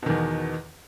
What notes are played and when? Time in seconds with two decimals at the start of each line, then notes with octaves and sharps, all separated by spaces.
0.03 B2
0.06 D#3
0.10 E2